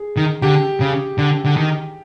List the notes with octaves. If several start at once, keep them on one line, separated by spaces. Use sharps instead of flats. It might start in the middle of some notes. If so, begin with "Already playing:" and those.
Already playing: G#4
D#3
D3 G4
C#3
D3
D3
D#3